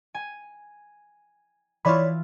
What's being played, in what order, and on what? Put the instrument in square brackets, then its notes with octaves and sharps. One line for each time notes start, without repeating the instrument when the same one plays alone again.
[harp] G#5
[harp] E3 E4 F4 [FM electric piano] C#5 D5 B5